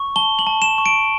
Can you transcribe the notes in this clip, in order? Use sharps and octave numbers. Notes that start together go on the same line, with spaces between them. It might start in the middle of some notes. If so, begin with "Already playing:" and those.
Already playing: C#6
A5 G7
F#7
A5
E7
C#6
D7